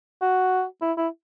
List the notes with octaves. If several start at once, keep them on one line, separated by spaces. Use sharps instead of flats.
F#4
E4
E4